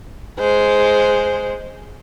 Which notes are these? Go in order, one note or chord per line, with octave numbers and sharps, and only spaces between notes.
G#3 C5